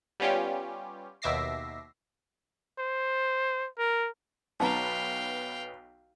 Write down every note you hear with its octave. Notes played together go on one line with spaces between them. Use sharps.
G3 B3 C#4 F4 G4
D#2 B2 E5 D6 A#6 C7
C5
A#4
B1 B3 D#4 F5 G5 A#5 B5